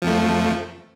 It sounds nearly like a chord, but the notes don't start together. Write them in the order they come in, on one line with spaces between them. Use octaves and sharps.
F3 F2 A3